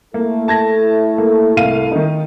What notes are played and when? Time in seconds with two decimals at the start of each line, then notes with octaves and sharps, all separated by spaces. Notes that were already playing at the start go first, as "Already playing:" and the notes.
0.14 A3 A#3 E4 A4
0.48 A5 G#6 A#6
1.18 A#3
1.57 C2 F5 D#7
1.92 D#3 D#4